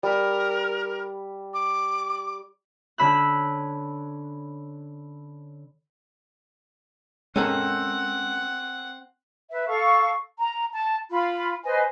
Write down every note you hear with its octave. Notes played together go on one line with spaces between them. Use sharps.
G3 A#4 B5
D6
D3 C#4 B5 E6 F#6
G#3 C4 C#4 A4 A#4 F#5
B4 E5
A4 F5 C#6
A#5
A5
F4 B5
B4 C5 D#5 G#5